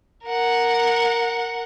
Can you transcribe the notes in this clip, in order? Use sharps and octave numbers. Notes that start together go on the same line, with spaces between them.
A#4 F#5